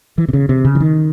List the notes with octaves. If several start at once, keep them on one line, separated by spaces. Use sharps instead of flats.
E3
C3
C#3
C3
C#3
E3
D#3